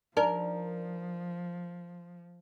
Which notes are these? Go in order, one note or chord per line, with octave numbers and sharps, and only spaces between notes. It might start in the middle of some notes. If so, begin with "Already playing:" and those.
F3 D4 D#4 A#4 D5